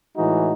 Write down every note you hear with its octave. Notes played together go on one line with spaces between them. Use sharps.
A2 E3 G#3 D#4 F#4